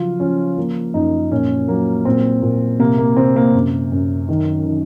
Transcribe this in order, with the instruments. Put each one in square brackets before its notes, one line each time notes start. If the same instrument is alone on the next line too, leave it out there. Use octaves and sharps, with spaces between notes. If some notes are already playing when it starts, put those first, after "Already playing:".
Already playing: [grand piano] C#3 F3 F#3 F4
F3 C#4
F3 A#3
F#2 D#4
A#2 C#4
F#3 A#3
A#2 C4
A#2
C3 A#3
A#3
C3 C4
A#3
F#2
F#2
D#3
D#3